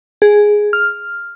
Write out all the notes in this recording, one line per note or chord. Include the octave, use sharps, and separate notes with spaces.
G#4
F6